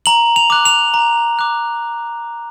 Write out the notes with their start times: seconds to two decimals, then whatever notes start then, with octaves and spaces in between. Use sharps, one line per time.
0.06 A#5 F#7
0.36 F7
0.50 D6 F#6
0.65 F7
0.94 A#5
1.39 D6 F#6